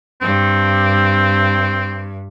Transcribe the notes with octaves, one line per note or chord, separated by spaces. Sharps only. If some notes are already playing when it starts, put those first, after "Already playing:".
G2 C4